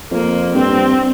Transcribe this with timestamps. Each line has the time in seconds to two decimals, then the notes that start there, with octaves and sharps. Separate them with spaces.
0.11 F2 A#3
0.55 G2 C4